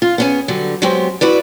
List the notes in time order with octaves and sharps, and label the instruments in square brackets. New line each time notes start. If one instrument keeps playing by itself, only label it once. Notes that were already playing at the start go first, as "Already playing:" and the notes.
[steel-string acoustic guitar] F4
B3 C#4 G#4
D3 F#3 G3
F#3 G#3 B3 C4 G4
E4 F#4 B4 D5